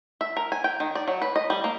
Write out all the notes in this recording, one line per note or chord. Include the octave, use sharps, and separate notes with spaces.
E5
A#4
G#5
G5
D#3
D5
F#3
B4
D#5
G3
A#3